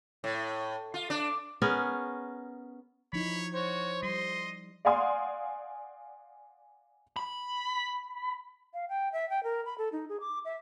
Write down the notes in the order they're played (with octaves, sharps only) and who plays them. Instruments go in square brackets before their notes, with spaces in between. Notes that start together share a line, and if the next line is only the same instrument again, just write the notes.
[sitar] A2
F4
D4
[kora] B3 C#4 G#4 A#4
[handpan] F3 D#4 E4 [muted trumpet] C#5 [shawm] B5
[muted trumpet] F#4 [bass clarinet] C5 [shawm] C#5
[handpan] G3 [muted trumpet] D#5 [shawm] C6
[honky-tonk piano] D5 F5 F#5 G#5 C6 D#6
[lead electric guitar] B5
[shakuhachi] F5
G5
E5
G5
A#4
B5
A4
D#4
G#4
D6
E5